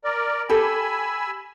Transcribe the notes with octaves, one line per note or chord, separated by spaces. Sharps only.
A#4 D5
G4 A4 G#5 B5 E6